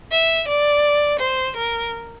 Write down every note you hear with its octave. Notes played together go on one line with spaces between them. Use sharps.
E5
D5
C5
A#4